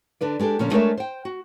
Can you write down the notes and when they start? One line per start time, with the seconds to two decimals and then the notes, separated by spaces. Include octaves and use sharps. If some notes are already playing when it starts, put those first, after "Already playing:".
0.21 D3 D4 B4 D5
0.39 G#3 D4 G4 A4
0.59 A#2 D3 F3 C#4
0.71 G#3 A3 D4 A#4 C#5 E5
0.97 C5 G5
1.25 F#4